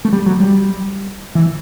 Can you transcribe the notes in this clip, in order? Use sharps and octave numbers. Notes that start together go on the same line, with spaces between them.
A3
G3
F#3
G3
E3